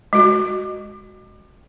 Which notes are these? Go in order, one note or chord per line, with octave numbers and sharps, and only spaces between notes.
G#3 F#4